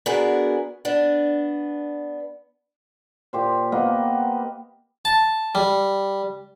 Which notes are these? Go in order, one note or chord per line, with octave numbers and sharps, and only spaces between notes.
B3 D4 F#4 G#4 A#4
B3 D4
A#2 G4 C5
A#3 B3 D#5
A5
G3